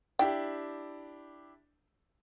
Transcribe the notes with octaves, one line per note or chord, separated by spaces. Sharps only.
D4 E4 G4 G5